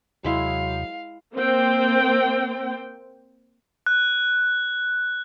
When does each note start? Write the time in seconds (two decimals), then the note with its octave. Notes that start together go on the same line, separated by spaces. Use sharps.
0.25 D#2 C3 F#3 G#3 E4 F5
1.35 A#3 C4 C5 G5
3.86 F#6